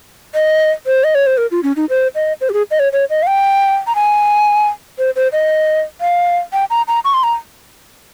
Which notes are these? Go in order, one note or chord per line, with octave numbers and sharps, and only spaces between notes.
D#5
C5
D#5
C#5
C5
A#4
F4
C#4
D#4
C5
D#5
C5
G4
G#4
D#5
C#5
C#5
D#5
F5
G5
A#5
G#5
C5
C5
D#5
F5
G5
A#5
A#5
C#6
C6
A#5